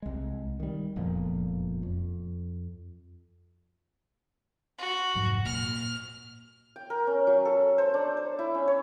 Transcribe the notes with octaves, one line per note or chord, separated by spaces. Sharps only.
C2 G#3
D#3 G3
E1 F2 A#2 F3
F2
F#4
F1 G#2 F#3
A#2 F6
G5
A#4
C#4
F#3
A4
C5
D4
C5
E4
C#4
C#5